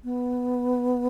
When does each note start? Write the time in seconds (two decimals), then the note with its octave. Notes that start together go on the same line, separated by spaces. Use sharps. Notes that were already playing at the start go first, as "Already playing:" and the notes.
0.04 B3